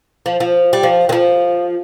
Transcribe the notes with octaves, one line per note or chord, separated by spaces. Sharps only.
F3
F3
G3
F3
D#3
F3